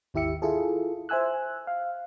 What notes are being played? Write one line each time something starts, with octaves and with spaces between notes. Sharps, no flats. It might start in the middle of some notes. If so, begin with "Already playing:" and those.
G#1 D#2 E4 G4 E5 C#7
E4 F4 G#4 A4
C5 E5 G#5 E6 F#6
F5